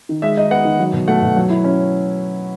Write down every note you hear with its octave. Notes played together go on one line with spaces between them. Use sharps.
D#3
G#3 E5
D#4 D#5
B3 F#5
D#3
F#3
B2
A3 F#5
B2
F#3
E4
C#4